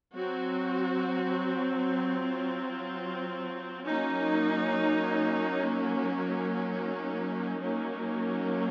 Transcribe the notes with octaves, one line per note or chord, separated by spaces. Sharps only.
F#3 C4 F#4
F4
F#3 A#3 C#4 D#4
D#4
F#3 A#3 C#4